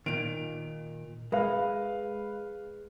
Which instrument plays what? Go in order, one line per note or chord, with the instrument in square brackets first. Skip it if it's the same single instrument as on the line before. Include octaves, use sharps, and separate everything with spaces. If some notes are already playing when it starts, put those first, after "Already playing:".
[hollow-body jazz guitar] A#2 D#3 [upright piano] D7 F7
[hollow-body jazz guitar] G#3 [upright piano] B4 F5